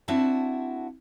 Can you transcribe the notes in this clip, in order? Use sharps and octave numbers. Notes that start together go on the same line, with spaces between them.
C4 D4 E4 F#4 E5 A5